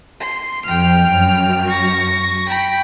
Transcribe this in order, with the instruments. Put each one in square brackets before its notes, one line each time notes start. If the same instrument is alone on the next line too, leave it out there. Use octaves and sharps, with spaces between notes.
[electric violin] C6
[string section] F2 [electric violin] G5 F6
[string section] F#2
[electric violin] C#6 A#6
G5 B5